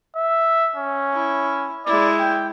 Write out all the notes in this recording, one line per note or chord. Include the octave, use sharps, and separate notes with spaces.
E5
C#4
E4
G#3 E4 D5
G5